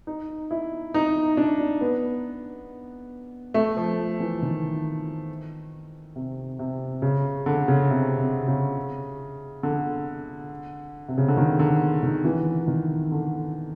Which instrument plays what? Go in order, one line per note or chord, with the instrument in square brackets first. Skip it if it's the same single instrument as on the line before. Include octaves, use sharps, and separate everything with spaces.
[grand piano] D#4
E4
D#4
D4
B3
A3
F3
E3
D#3
C3
C3
C#3
D3
C#3
C3
C3
C#3
D3
C3
C#3
D3
D#3
D3
D#3
E3
D#3
D3